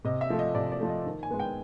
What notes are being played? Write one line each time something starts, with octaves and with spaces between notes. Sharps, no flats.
C3 D#5
E5
F3 A3
D#5
C3 D5
D5
F3 A3
D#5
D#3
G#5
G#3 B3
G5